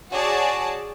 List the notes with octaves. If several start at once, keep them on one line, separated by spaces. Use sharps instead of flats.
F#4 G#4 C#5 D5 A5